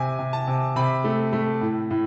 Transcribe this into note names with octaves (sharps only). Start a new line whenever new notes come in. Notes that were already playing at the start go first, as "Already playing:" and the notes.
Already playing: C3 G#5
C3
A5
C3
C3 B5
A3
A3
A2
A2